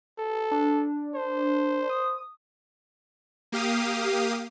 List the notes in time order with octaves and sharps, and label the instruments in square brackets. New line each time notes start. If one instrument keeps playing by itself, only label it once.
[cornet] A4
[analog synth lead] D4
[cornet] C5
[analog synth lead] D#6
[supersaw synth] A#3 G4 F5 D#6